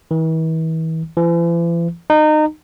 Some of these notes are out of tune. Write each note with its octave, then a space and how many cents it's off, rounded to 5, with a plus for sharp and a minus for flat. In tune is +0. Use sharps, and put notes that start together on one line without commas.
E3 -40
E3 +45
D#4 -25